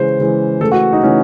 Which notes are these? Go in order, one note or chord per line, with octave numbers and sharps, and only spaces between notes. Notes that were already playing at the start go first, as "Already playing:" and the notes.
Already playing: C#3 E3 G#3 C5
C#3 E3 G#3
C#3 E3 A3 A4
F#4
D#4
C#3 E3 A3 C#4